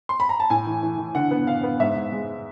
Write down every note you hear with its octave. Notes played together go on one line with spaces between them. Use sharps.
C6
B5
A#5
A5
A2 G#5
E3
E3
E3
D3 F#5
B3
D3 F5
B3
G#2 E5
G#2
G#3